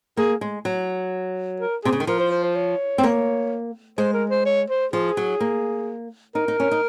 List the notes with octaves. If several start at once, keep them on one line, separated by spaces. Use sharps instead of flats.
A#3 G#4
G#3
F#3
A#4
C3 G#4
C#3
D#3
F3 A#4
C5
C5
C5
C#5
C4
A#3
G#3 C5
A#4
C5
C#5
C5
F3 G#4
F#3
A#3
D#4 A#4
D#4
C#4
D#4